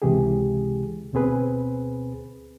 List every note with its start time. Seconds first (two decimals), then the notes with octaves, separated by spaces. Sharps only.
0.02 C#2 C3 E3 G#3 G4 G#4
1.13 D2 B2 C4 G#4 B4